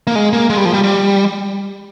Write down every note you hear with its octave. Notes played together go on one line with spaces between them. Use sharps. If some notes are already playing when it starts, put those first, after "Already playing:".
A#3
G#3
A#3
G#3
G3
F3
G3
G3